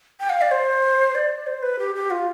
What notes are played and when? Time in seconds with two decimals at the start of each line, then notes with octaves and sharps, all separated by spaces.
0.20 G5
0.30 F5
0.41 D5
0.51 C5
1.15 D5
1.47 C5
1.63 B4
1.79 G4
1.95 G4
2.11 F4